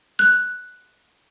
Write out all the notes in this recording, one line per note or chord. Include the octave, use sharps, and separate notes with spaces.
F#6